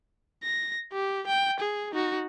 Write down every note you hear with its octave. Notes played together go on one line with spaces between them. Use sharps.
A#6
G4
G5
G#4
D#4 F#4